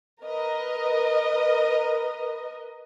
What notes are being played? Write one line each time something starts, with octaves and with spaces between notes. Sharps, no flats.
A#4 B4 D#5